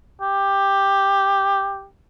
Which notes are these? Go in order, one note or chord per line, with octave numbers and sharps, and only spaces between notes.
G4